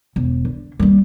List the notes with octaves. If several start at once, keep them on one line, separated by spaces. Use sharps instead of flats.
E1
D3
G3 A#3